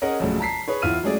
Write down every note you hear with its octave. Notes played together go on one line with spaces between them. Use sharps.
C#4 G#4 A#4 D#5 F#5
A#1 F#2 C#3 F#3 A3
A5 A#5 B6 C7
G#4 B4 C#5
E2 E4 F4 F6 D#7
F#3 G#3 A3 C#4 G#4 D5